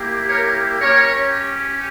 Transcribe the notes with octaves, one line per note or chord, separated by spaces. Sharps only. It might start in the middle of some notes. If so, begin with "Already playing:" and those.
Already playing: A#3 E4 G4
A#4 C#5
C#4 G4 A#4 C#5